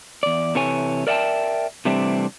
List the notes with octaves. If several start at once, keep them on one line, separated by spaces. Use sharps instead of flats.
E2 D5
C3 E3 A4 C#5 G#5
A#4 D5 E5 F#5 G5 A5
C3 E3 G3 A3 C4 D4